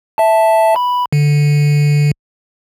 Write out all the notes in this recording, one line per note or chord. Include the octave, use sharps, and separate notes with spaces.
E5 A5
B5
D3